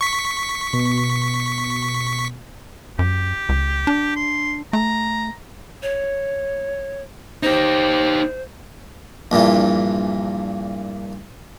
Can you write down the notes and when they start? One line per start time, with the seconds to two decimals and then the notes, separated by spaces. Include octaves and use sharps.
0.01 C#6 B6
0.73 B2
2.99 F#2 G4
3.49 C#2
3.87 D4
4.16 C6
4.73 A3 A#5
5.83 C#5
7.43 D#4 G4 C5
9.31 A#1 G2 A#2 E3